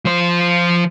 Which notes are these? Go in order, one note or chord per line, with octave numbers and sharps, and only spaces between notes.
F3 C5